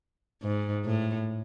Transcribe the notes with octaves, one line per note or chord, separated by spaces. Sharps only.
G#2
A2